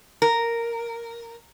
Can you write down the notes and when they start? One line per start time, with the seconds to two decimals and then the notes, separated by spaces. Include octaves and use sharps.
0.22 A#4